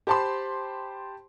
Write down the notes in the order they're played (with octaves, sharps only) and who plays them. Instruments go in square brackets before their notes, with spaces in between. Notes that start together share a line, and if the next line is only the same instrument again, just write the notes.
[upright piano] G4 C5 A5 B5 C6